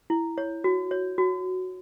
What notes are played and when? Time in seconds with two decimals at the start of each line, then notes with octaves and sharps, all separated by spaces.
0.10 E4
0.38 C#5
0.64 F#4
0.91 C#5
1.18 F#4